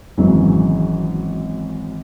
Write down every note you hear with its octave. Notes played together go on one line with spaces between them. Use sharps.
G#1 C#3 E3 F#3